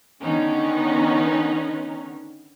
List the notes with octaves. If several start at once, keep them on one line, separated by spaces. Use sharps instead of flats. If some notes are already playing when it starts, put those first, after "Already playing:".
D3 D#3 B3 C#4 D#4